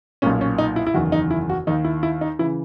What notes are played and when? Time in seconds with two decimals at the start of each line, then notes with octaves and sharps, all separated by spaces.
0.22 B1 A#2 C#4
0.41 C#4
0.58 D#4
0.76 E4
0.87 E4
0.94 F#1 E2 D#3 F#4
1.12 D#4
1.31 E4
1.50 F#4
1.67 D#2 D#3 D#4
1.84 E4
2.03 E4
2.21 D#4
2.39 C#3 E3 E4